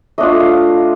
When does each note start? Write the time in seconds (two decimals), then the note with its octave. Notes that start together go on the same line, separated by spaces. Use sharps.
0.18 A3 D4 F4 D#5
0.40 F5